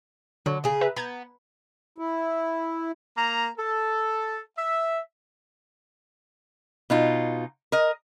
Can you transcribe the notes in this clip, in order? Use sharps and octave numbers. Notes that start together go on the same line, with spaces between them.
D3 F#3
C#3 G#4
B4 E5 A#5
B3 A#5 G6 G#6
E4
A#3 A#5
A4
E5
B2 D#4 F4
A#4 D#5